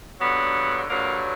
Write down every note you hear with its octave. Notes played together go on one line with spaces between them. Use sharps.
G2 D3 F#3 B3
G2 D3 F#3 A#3